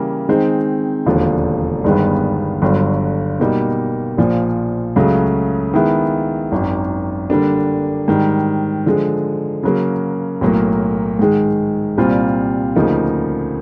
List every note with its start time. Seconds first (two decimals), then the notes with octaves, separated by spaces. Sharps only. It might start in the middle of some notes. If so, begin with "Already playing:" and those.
Already playing: C#3 E3 G3 A#3
0.29 D#3 G#3 C4 D#4
1.06 E1 D#2 D3 F3
1.84 G1 G2 D#3 G#3 B3
2.62 G1 G2 D3 F#3
3.40 B2 G3 A#3 D#4
4.17 A#1 A#2 F3
4.96 C#2 C#3 F#3 A3
5.74 D#3 G#3 B3 E4
6.52 G#1 F#2 D#3
7.30 D3 G3 A#3 D4
8.08 G#2 D#3 G3
8.86 D3 F3 G#3
9.63 C#3 F#3 A#3
10.41 B1 A2 F#3 A#3
11.19 G#2 D#3 G#3
11.97 C2 A#2 G3 C4 F4
12.76 D2 C#3 F3 A#3 D#4